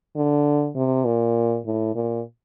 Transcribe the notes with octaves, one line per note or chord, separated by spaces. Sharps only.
D3
C3
A#2
A2
A#2